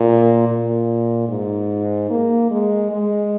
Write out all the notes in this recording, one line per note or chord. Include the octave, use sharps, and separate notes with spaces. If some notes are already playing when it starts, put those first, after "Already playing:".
Already playing: A#2
A#2
G#2
A#3
G#3
G#3